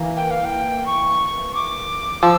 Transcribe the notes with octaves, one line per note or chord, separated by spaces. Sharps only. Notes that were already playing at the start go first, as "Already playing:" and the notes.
Already playing: E3 A#3
G5
F5
G5
C#6
D6
F3 E6